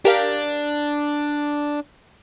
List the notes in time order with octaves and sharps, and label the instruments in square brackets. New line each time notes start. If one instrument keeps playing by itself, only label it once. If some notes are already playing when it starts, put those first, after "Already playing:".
[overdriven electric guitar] D4 [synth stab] G4 A#4 F5